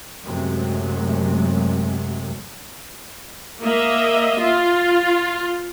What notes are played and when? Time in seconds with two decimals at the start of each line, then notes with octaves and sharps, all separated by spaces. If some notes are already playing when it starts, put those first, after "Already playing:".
0.25 F#2 A2 C3 F#3 G#3
3.61 A#3 D#5 E5
4.40 F4